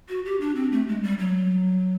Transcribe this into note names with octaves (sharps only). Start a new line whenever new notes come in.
F#4
G4
D4
C4
A3
G#3
G3
F#3